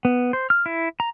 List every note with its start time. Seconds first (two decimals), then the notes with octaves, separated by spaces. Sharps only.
0.05 B3
0.33 C5
0.50 F6
0.66 E4
1.00 A#5